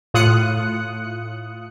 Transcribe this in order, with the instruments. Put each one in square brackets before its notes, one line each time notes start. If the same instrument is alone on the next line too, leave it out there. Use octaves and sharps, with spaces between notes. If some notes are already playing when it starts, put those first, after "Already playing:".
[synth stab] A2 F4 D#6 F#6 C#7